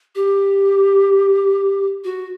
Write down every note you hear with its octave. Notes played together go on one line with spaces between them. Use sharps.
G4
F#4